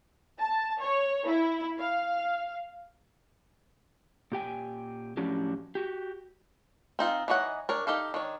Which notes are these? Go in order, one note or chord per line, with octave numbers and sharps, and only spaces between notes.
A5
C#5
E4
F5
A#2 G4 G5 G#5
A2 F3 F#3 C#4 D4 G4
F#4 G4
C4 D#4 F4
E3 D#4 C#5 D#5 F#5
D4 A#4 C#5
D#4 G4 A4 F5
D#3 D4 C#5